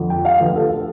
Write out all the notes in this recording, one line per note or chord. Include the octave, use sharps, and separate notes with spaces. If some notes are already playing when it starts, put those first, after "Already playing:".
Already playing: F2 D3 F3
G5
F5
D2 D3 F3 B4
A4
A4